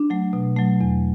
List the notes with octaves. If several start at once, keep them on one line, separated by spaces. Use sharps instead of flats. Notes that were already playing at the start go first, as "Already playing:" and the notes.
Already playing: D4
F#3 A3
B2
F#3 A3
E2